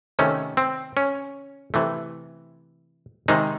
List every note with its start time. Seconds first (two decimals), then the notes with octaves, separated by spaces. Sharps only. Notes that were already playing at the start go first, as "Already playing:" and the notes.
0.19 C3 D#3 A3 C#4
0.57 C4
0.97 C#4
1.74 C3 E3 A3
3.28 C3 D#3 G#3 D#4